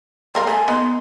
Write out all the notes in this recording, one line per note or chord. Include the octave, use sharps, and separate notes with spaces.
G3 A#4 F5 C6
A3 G#5
A#3 B3 D#4 C6